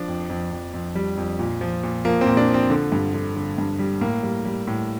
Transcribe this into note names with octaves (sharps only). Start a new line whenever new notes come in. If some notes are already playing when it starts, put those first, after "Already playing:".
Already playing: F3 D4
F2
F2
F2
F2
G3
F2
A#2
F3
A#2
F3 A#3
C4
A#2
D4
F3
C4
D3
G2
D3
D3
G2
G3
A2 A#3
G3
G3
A2